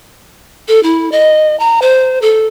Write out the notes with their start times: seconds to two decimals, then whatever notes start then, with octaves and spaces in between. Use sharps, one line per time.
0.68 A4
0.83 E4
1.12 D#5
1.60 A#5
1.82 C5
2.22 A4